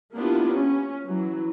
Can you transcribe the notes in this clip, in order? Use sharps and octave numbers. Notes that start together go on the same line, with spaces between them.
A#3 B3 D4 E4 F4 G4
C#4
E3 F#3